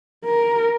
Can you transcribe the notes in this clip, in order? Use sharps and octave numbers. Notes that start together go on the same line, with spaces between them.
A#4